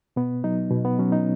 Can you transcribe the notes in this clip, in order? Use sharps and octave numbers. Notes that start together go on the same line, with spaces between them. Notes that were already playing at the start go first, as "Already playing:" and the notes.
B2 B3
F#3 D#4
B2
B3
F#3 C#4
D#4